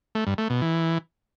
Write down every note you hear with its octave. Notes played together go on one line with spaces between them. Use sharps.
A3
G2
A3
B2
E3